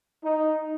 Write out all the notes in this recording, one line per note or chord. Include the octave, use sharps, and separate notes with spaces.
D#4